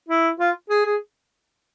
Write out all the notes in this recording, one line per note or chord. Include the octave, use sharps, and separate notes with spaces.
E4
F4
G#4
G#4